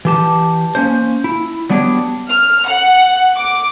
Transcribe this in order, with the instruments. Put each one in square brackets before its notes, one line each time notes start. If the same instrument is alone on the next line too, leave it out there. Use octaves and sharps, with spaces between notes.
[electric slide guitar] E3 G4 A5
A#3 C#4 C5
E4
F#3 G3 B3 D4 G4 C#5
[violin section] F6
F#5
D6